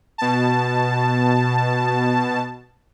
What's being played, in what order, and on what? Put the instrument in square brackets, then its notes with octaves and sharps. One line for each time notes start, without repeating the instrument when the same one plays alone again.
[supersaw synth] B2 A5